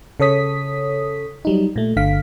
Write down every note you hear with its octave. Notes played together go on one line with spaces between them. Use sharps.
C#3 A4 C#5 D#6 B6
F#3 G3 D#4
A#2 A3
G1 D3 F5 B6